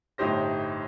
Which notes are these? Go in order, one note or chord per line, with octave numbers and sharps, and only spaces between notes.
G1 A2 D#4 G4 C5 A#6